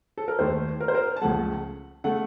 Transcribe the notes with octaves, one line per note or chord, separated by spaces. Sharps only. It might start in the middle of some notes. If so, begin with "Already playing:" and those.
A4
A#4
D#2 D#3 A3 C5
A#4
C5
A#4
A5
C#2 C#3 F3 A3 F#5
C#3 A3 F#5